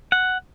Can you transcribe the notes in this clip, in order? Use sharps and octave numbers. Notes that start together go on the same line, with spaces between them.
F#5